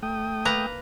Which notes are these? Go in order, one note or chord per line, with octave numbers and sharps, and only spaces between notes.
A3 G5 D#6
A#3 B4 A#5